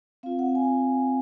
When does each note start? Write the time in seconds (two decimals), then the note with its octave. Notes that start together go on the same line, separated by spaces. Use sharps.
0.23 C4 F4 F5
0.39 F#5
0.55 G#5